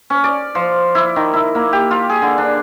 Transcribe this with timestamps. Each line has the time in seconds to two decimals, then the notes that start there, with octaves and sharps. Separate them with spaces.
0.10 C#4
0.24 D5
0.55 F3
0.95 E4
1.16 D#3
1.34 E4
1.55 A#3
1.73 G4
1.91 F4
2.10 G#4
2.22 D3
2.38 D4